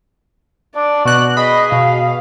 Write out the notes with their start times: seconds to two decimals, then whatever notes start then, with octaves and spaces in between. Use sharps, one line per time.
0.76 D4 D5
1.05 B2 F#4 F#6
1.37 G#4 D#5 B5
1.72 B2 F5